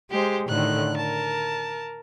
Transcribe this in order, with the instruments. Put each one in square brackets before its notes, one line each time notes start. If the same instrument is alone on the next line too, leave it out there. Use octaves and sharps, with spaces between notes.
[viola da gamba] G#3 [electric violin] G4 C5
[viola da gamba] A2 D3 D#3 [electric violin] F#6
[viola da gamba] A#4 [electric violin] A5